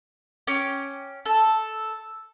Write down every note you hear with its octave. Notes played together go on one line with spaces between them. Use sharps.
C#4 G5 D6
A4